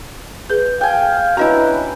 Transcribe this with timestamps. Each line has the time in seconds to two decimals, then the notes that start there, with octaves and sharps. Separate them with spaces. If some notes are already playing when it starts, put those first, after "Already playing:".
0.50 G#4 B4 G6
0.81 F5 G5 G#5
1.37 C#4 D4 E4 F#4 B4 D#5 A#5